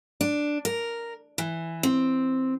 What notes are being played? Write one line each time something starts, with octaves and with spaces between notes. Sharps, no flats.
D4
A#4
E3
C4